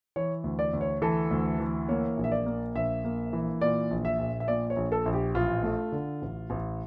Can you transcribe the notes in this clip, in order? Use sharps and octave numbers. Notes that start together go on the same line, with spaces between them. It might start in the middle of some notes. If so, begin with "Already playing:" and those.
E3 C#5
D2
D5
D2
C#5
E3 A4
D2
E3
A#3 C#5
A#1
E5
D5
A#3
A#1 E5
A#3
E3
A#2 D5
A#1
E5
A#1
E5
A#2 D5
C#5
A#1
A4
A#1
G4
A1 F4
A3
D3
A1
A1